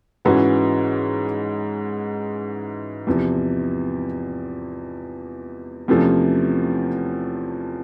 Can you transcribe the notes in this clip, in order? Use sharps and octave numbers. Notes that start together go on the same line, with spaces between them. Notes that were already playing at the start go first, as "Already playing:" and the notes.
G#2 E3 G#3 C#4 F#4
E2 C3 F3
E2 C3 F3 A3 C#4